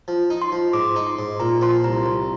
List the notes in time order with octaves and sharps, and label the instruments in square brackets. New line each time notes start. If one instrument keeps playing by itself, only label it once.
[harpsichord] F3
D#4
[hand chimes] C6
[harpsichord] F3
[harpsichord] G#2 [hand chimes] D6
[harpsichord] D#4
[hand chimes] C6
[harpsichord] G#2
[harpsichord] A#2 [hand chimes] A#5
[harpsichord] F3 [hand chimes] C6
[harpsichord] C2 [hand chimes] A#5
[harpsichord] C2 [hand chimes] A#5